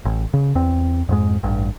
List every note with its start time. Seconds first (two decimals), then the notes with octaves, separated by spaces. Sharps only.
0.05 A1
0.34 C#3
0.55 E2 C4
1.09 F2 G#2 G#3
1.43 A1 G2